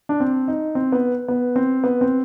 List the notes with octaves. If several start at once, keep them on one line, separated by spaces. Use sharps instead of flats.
D4
C4
D#4
C4
B3
B3
C4
B3
C4